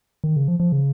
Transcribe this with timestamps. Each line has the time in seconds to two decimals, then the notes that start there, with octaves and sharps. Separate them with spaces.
0.24 D#3
0.36 C#3
0.48 F3
0.60 F3
0.72 C#3